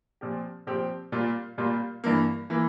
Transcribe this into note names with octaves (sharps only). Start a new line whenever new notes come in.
A#2 F3 C4 G4
A#2 F3 C4 G4
A#2 G3 A#3 F4
A#2 G3 A#3 F4
G2 E3 A#3
E3 A#3